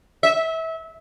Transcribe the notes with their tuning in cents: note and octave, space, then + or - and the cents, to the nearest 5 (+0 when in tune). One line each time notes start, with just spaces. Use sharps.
E5 -25